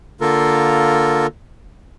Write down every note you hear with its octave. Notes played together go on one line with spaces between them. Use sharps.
D3 A#3 F4 A4 A#4